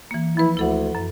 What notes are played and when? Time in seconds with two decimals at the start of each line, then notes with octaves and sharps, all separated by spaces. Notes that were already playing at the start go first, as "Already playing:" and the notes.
0.11 E3 A#3
0.37 F3 E4 B4
0.57 D2 E4 A4 F#5
0.95 F#2